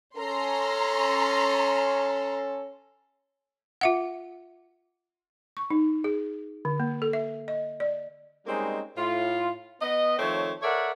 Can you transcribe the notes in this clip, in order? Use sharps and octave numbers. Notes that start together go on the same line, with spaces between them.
C#4 A4 A#5 C6
F4 E5 F#5
C#6
D#4
G#4
D3
A#3
A4
E5
D#5
D5
G3 G#3 A#3 C4 C#4 D#4
A2 F4
B3 D#5
D#3 F3 A3 C4 C#5
A4 A#4 C#5 D5 E5 F#5